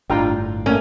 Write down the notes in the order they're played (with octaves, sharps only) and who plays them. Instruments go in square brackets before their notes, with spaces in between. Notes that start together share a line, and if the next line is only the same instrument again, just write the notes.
[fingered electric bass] G1 A2 [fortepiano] D4 F4 A#5 [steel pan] G5
[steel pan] A3 A#3 G#5 [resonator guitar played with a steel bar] C#4